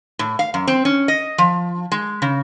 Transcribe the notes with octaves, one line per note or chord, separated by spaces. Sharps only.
A2
F5
F#2
C4
C#4
D#5
F3
G#3
C#3